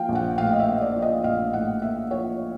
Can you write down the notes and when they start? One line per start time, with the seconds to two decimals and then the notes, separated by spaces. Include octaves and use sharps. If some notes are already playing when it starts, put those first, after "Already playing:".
Already playing: F3 A#3 F5 G5
0.09 A#1
0.15 F#5
0.38 A2 F5
0.53 D#5
0.60 E5
0.66 A#3
0.81 D5
0.96 F3
1.02 D#5
1.24 A#1 F5
1.53 A2 F#5
1.82 A#3 E5
2.11 F3 C#5